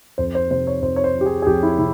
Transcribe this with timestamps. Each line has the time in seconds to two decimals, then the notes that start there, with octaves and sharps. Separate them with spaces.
0.18 F2 C5
0.35 C5
0.51 C3 C5
0.67 C#5
0.82 F2 C5
0.96 C#5
1.04 C5
1.14 F3
1.21 G4
1.26 G#4
1.42 G#4
1.47 F2 G4
1.63 E4
1.79 C3 E4